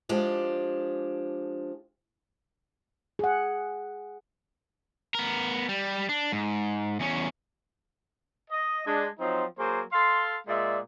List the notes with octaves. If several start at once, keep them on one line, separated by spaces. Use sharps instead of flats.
F3 G#3 D4 G4
G#4 F#5
B3 A#4
G3
D4
G#2
E2 C#4
D#5
G#3 D4
F3 F#3 C4 D#4
F#3 A#3 G#4 C5
A4 F5 C6
A#2 G#3 D5 E5